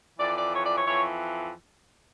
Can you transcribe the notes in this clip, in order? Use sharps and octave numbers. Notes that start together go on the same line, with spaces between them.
F2 E3 D5
D5
C#5
D5
C#5
F2 E3 C#5